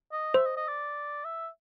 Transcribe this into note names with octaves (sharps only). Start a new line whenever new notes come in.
D#5
C5 E5
D#5
D#5
D5
E5